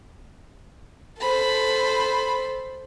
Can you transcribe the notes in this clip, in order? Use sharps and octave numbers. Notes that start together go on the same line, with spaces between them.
A4 C5 B5